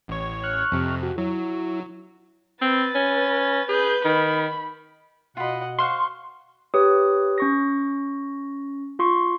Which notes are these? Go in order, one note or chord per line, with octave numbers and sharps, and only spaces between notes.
A1 C#5
C#6 F6 F#6
F2 C3
F#4
F#3 E4
C4 B4 A6
C#4
G#4 B4 G6
D#3 B5
B2 F4 D#5 F#5 B5
C5 F5 F#5 C6 C#6
G4 B4 C#5 D#6
C#4 C#6 A#6
F4 C6 C#6